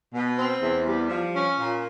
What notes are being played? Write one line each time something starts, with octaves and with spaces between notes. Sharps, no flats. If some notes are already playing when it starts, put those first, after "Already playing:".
B2
C4
E2
G3
F3
C#4
A#2